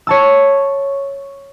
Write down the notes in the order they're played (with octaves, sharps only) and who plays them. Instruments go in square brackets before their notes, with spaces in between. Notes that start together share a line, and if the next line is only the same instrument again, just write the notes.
[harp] C#5 A5 E6